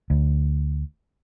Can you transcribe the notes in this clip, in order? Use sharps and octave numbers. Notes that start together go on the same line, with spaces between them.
D2